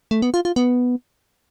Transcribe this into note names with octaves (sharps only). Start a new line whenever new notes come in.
A3
B3
F4
F4
B3